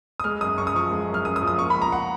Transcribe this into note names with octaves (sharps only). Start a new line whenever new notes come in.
D#6
G#3 F6
F#2 D#6
F#2 C#6
D#6
F3 C#6
G#3
F#2
F6
F#2 D#6
D#6
F3
D#6
A#3 C#6
C#2 B5
A#5
F#5